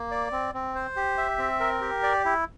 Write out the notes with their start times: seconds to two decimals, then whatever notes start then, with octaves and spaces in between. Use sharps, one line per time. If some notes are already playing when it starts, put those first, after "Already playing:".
Already playing: A#3
0.11 D5
0.32 C4
0.54 C4
0.75 C5
0.96 G4
1.18 E5
1.38 C4
1.60 A#4
1.81 G4
2.03 D5
2.25 E4